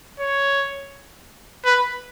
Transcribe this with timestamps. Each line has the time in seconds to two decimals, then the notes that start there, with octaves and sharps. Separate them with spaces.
0.20 C#5
1.65 B4